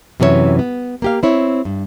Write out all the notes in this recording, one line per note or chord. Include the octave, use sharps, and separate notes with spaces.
F#2 C3 E3 A#4 C#5 E5
B3
A#3 G4 F5
C4 E4 C#5
G2